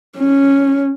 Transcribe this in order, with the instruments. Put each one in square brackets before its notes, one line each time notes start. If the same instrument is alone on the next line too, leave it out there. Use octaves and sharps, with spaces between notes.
[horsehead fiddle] C#4